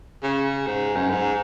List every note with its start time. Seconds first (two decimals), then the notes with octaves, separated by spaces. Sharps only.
0.23 C#3
0.67 G#2
0.96 F#2
1.10 G#2